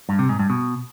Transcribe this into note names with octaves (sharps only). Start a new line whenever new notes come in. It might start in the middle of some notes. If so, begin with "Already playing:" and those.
G2
C3
G#2
G2
B2